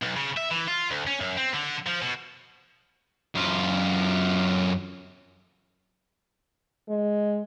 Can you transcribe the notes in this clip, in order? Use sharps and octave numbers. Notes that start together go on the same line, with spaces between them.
B1
C#3
E5
E3
F4
D2
C#4
F#2
C4
D3
F3
B2
F#2 F4
G#3